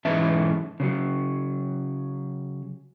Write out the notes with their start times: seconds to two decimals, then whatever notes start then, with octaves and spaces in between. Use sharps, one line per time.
0.05 B1 G#2 E3 C#4 E5 A5
0.80 C#3 E3 F#3